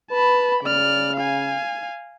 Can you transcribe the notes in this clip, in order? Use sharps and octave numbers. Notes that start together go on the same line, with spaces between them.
B4 A5 B5
C#3 D5 F6
F5 G#5